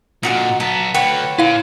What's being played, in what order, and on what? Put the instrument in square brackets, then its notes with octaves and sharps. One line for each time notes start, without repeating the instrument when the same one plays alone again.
[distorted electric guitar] A#2 D3 [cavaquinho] D#4 F#4 F#5
[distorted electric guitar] B1 B3 [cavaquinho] A5 A#5
[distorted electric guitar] D2 D3 [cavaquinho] B4 C#5 F#5 [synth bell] G5
[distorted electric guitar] A#2 [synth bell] E4 F5